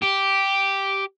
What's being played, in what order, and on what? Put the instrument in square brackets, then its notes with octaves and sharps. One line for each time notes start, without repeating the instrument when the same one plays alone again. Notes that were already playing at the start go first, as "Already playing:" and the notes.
[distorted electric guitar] G4